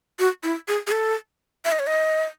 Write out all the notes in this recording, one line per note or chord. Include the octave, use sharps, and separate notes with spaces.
F#4
E4
G#4
G#4
A4
E5
D#5
C#5
D#5